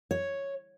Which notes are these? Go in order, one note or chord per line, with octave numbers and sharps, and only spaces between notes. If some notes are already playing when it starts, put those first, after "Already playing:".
C#5